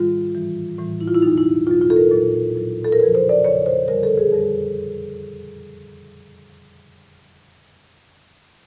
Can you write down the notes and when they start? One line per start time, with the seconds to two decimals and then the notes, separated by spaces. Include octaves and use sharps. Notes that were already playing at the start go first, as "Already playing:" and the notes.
Already playing: G#2 D#3 G3 F4
0.34 A2 E3 G3
0.78 A2 E3 G3
1.01 E4
1.07 F4
1.14 E4
1.22 E2 B2 F#3 D#4
1.38 E4
1.67 E2 B2 F#3 F4
1.81 F4
1.90 A4
1.96 A#4
2.11 A#2 F#3
2.56 A#2 F#3
2.85 A4
2.92 A#4
2.99 E2 C#3 F3 B4
3.15 C5
3.29 D5
3.44 E2 C#3 F3 C#5
3.66 C5
3.88 F2 D3 G3 A#4
4.03 A4
4.17 G#4
4.32 F2 D3 G3